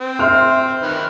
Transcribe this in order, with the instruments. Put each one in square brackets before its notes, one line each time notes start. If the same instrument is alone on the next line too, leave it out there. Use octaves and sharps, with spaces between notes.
[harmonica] C4
[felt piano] E5 C6 F6
[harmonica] D#3 B4 F6